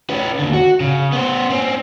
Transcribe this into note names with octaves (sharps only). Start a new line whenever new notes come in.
C#4 B4
D#2 D3
F#4
C#3
B3 C5
C4 C#4